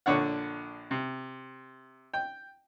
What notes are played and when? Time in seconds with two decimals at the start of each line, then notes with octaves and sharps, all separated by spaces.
0.06 A#1 D3 C#5 F#5
0.91 C3
2.14 G5